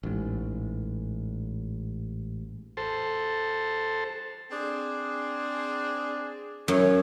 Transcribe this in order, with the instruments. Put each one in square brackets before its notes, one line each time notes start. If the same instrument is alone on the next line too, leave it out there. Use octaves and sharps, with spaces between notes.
[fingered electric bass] A1 G#2
[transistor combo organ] A4 C5
[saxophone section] C4 D4 G#4
[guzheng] F#2 [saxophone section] D#4 E4 C#5